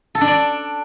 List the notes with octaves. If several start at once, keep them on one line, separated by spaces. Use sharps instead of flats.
A4
D4
D5